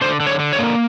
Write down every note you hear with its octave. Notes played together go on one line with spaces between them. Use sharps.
D3 C5
D3
C#5
D3
C#5
A#3